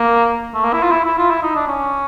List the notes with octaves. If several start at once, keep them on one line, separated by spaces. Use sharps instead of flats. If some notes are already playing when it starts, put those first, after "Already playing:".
Already playing: A#3
A3
A#3
E4
F4
E4
E4
F4
E4
D#4
D4
C#4